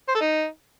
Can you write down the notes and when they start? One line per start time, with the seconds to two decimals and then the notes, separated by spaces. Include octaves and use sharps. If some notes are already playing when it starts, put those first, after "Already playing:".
0.08 C5
0.15 A4
0.21 D#4